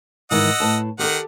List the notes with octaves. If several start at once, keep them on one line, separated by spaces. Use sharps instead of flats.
G#2 D#3 E3 D#5 F#5 E6
A2 B4 A5
D#3 G4 A4 F#5